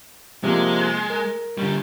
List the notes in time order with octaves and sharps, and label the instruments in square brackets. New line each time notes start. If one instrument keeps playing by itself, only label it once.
[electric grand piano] C3 F3 A#3 [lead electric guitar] G#3
[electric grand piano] A#4
[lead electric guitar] D3 G3